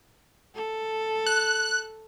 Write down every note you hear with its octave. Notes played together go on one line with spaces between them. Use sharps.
A4
F#6